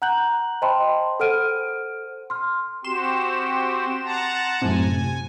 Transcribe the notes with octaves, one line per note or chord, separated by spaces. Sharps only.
F#5 A#5 F#6 G6 F#7
C5 D#5 G5 A5 B5 C6
A4 C5 F#5 F6 D7 D#7
C6 F6
C4 F#4 G4 C6 E7
F#5 A5 A#5
F#2 A2 C3 G#5